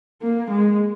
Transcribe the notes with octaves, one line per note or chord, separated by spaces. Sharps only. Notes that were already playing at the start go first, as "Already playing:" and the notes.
A#3
G#3